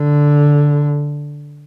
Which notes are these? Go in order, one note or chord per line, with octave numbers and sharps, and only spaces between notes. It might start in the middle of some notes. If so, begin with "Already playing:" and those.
Already playing: D3